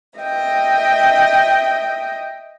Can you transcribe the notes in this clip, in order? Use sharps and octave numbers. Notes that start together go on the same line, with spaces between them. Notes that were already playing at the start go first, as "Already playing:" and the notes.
D#5 E5 G5